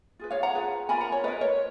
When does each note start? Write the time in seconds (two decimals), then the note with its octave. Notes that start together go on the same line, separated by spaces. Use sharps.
0.19 F4 G#4 B4
0.31 C#5 F5
0.43 F#5 A#5
0.54 F4 G#4 B4
0.89 F4 A#4 G#5 B5
1.01 F#5 A#5
1.12 C#5
1.24 F4 A#4 B4 D#5
1.41 C#5